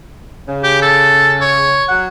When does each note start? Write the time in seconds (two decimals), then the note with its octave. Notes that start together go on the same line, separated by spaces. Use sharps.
0.47 C#3
0.63 G4
0.82 A4
1.41 C#5
1.88 F#3 F#5